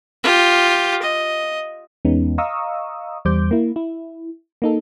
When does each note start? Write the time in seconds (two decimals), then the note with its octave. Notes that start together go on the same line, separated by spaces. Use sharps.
0.24 F4 G4
1.02 D#5
2.05 E2 G#3 B3 C#4 D#4
2.38 D#5 F5 A#5 C#6 D#6 E6
3.25 E2 G3 C5 D6 G6
3.51 A#3 E4
3.76 E4
4.62 A#3 D#4 A4